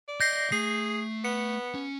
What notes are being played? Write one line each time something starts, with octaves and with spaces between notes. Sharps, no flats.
D5
D#5 E5 G6 A#6 C7
A3 G#4 C7
B3 C#7
C#4